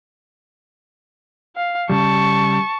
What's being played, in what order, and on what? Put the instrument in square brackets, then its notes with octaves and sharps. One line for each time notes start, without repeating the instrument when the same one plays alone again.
[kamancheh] F5
[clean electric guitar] C#3 G3 [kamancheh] A5 C#6